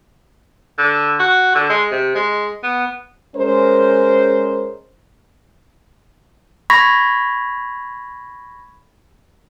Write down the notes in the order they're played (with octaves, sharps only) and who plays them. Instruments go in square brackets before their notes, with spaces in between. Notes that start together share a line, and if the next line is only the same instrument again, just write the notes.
[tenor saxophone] D3
F#4
D3
G#3
C3
G#3
B3
[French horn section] G#3 C#4 A#4 C5
[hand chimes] B5 C#6 G#6 A#6 B6